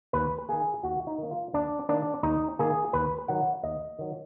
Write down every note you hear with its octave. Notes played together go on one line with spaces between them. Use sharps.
D#2 B4
D#3 A#3 G#4
D#2 F#4
D#4
D#3 A#3
F4
D#2 D4
D#3 A#3 D4
D#2 D#4
D#3 A#3 G#4
D#2 B4
D#3 F#3 F#5
D#2 D#5
D#3 F#3